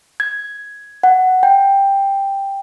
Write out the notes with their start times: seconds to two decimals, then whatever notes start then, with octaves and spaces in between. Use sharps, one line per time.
0.20 G#6
1.03 F#5
1.43 G5